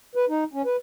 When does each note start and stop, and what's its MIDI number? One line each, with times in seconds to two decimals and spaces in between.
0.15 0.25 71
0.29 0.44 63
0.53 0.62 61
0.65 0.76 71